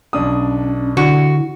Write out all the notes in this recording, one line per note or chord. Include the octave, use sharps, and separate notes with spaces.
B1 C#4 D4 D#6
D3 E4 F#4